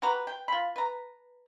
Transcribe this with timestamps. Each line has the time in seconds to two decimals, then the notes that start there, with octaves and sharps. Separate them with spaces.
0.02 F#4 G4 B4 A#5
0.27 G5
0.48 F4 B5
0.76 B4 A#5